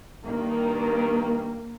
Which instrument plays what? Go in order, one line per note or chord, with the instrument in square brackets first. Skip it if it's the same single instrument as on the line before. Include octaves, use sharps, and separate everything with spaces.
[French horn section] G2 D#3 [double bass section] A#3